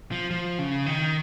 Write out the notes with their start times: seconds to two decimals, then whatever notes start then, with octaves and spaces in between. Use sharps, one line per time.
0.12 F3
0.31 F3
0.59 C#3
0.86 D#3